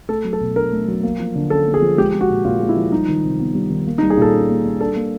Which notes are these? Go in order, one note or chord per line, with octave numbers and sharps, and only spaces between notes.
A3 A4
F#3
A4
B2
D4 A#4
A3
F#3
A#3
F3
D3
C#4 A4
A#3
G#4
F3
G#3 G4
F3
F#4
A#2
A#2 F4
G#3
E4
F3
G3 D#4
D#3
C3
B3
G3
D#3
A#3
D#4
G3
G#4
A#2 A4
C#4
A#3
G3
D4 A4
A#3